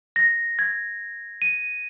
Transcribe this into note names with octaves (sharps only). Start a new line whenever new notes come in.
A#6
G#6
D#7